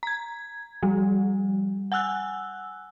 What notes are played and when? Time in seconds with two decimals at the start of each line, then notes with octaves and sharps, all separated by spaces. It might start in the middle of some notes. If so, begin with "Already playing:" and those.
0.03 A#5 G#6
0.83 F3 G3
1.92 F#5 G#5 E6 F#6